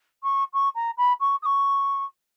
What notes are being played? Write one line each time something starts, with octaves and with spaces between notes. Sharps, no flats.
C#6
C#6
A#5
B5
C#6
D#6
C#6